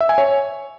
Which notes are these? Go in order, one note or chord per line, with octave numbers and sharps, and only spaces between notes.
E5
G#5
C#5